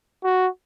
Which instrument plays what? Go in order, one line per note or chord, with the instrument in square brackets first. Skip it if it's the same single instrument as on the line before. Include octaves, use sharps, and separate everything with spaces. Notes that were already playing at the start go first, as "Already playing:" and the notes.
[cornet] F#4